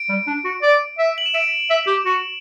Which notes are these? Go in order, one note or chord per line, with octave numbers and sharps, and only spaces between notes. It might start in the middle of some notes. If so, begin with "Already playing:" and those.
Already playing: D7
G3
D4
F#4
D5
E5
F#7
E7
E5 D7
E5
G4
F#4